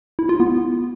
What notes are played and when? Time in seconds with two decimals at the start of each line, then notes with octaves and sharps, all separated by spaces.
0.19 E4
0.29 F4
0.40 B3